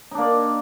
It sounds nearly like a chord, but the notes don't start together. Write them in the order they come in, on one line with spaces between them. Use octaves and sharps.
D#4 D4 A#3 D5